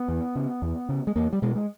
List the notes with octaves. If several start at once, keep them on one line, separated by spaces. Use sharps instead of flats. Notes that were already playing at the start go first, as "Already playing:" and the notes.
Already playing: B3
E2
C#3
E2
C#3
G#3
E2 A#3
G3
B2 G#3
G#3